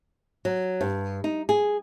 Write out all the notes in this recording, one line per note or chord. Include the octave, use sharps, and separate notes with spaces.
F#3
G2
D#4
G#4